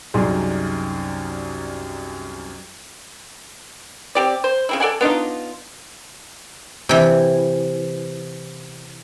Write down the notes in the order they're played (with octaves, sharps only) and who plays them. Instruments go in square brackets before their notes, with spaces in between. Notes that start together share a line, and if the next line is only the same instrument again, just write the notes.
[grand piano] C2 F#2 D#4 G#4 D5 C6
[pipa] C4 G4 D5
C5
C#3 C4 E4
A4 D5 F#5 G#5
B3 D4 D#4 F4
[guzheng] C3 E3